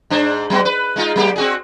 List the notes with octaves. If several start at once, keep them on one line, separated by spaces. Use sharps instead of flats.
G#2 D4 C5
F#3 B3 F#4
B4
G#3 D#4 F4
F#3 A#3 G4
C4 F#4 G#4